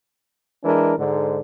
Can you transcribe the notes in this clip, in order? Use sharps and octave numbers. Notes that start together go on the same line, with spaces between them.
E3 G#3 D4 A#4
G#2 D3